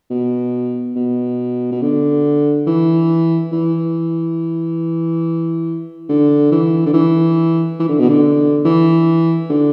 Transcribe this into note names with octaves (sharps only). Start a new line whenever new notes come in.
B2
B2
B2
D3
E3
E3
D3
E3
D3
E3
E3
D3
B2
D3
E3
D3